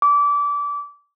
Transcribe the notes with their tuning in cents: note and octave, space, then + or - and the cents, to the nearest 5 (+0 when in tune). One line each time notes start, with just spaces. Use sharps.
D6 -25